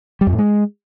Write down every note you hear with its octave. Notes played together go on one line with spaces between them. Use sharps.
G3
F2
A2
G#3